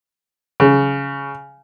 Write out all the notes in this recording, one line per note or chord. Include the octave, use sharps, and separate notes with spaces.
C#3